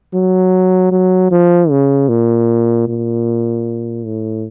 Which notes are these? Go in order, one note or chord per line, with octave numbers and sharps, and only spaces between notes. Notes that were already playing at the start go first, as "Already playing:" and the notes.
F#3
F#3
F3
C#3
A#2
A#2
A2